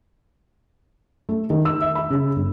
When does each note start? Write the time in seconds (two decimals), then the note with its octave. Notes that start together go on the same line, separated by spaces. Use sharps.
1.29 A3
1.50 D#3
1.65 E6
1.81 E5
1.95 B5
2.10 C#3
2.36 G1